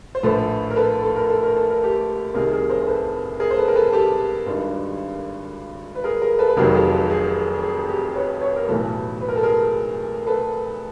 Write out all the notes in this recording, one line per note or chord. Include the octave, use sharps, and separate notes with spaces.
C5
A#1 A2 F3 A4 B4
A#4
A4 B4
A4
A#4
A4
A#4
A4
A#4
G4 A4
C2 C3 D#3 G#4 A#4
G#4 A#4
A#4 C5
C5
A4 B4
G#4 A#4
C5
A4 B4
A#4
A4 B4
G4 A4
G#1 G2 D#3
B4
G#4 A#4
G#4 A#4
A4 B4
B4
F1 F2 C3 D#3 F#3 G#4 A#4
G4 A4
G4
G#4
G#4
G4
B4 C#5
B4 C#5
A#4
B1 A2 E3 A4 B4
B4
A#4
A4
G#4 A#4
A4 B4